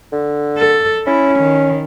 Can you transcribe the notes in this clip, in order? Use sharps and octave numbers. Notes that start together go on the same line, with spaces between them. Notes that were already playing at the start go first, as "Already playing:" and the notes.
D3
A4
C#4 E4
D#3